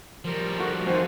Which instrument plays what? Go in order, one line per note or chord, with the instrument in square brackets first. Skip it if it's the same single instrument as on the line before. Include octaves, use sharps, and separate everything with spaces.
[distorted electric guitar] F3 G3 [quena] A#4
[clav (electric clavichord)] A3 F#4
[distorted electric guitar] F2 [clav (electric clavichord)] D#3 F#4 A5 [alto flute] C5 [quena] G#5